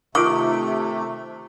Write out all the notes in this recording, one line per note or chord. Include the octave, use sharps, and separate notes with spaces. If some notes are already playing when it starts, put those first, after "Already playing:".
C3 D#3 A3 F4 D6